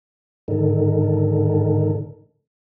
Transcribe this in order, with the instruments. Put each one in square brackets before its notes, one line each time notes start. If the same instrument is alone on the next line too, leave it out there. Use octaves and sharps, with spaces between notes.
[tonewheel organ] G#2 D3 D#3